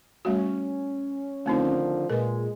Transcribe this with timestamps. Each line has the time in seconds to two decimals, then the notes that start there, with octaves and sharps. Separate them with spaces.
0.25 G3 A3 C#4 F#4
1.46 D3 D#3 F3 A3 C4 D#4
2.10 A#2 G#3 A#4 B4